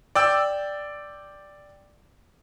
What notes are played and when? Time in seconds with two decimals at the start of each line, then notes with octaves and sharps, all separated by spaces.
0.15 D5 G5 E6